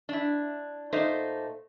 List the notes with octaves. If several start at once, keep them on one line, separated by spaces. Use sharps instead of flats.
D4 E4
A#2 A3 D#4 C5